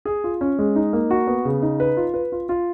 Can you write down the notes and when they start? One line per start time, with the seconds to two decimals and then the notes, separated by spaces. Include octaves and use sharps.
0.05 G#4
0.24 F4
0.41 C#4
0.59 G#3
0.76 D#4
0.93 A#3
1.11 F#4
1.27 B3
1.45 C#3
1.62 D#4
1.80 B4
1.97 F4
2.14 B4
2.32 F4
2.49 F4